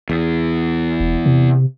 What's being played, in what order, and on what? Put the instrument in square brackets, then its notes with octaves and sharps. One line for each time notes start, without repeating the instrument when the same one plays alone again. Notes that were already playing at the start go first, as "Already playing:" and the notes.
[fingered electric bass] E2
[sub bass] E1
C3